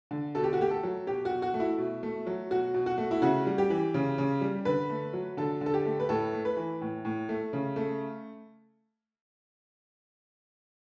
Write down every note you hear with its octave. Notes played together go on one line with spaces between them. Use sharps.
D3
B2 A4
G4
F#4
A3 G4
A4
F#3
B2 G4
F#4
B2
F#4
A3
E4
B2
A3
F#3
B2 F#4
B2
F#4
A3
E4
C#3 F#4
G3
G4
E3
C#3
C#3
G3
D3 B4
A3
F#3
D3 A4
D3 A4
G4
A3
B4
A2 A4
A3
B4
E3
A2
A2
A3
C#3
A3